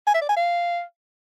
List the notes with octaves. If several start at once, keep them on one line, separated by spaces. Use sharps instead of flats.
G#5
E5
D5
G#5
F5